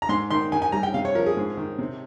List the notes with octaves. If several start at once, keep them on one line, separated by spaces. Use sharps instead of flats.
A#5
G#2 C6
D#3 C6
D#3 G#5
G#5
G3 A#5
G5
C3 F5
C#5
F3 A#4
G#4
G#2
D#3
C3